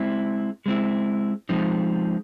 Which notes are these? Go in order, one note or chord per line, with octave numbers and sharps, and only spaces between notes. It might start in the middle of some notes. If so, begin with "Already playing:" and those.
Already playing: G#3 C4 E4
G#3 C4 E4
F3 G#3 C4 D#4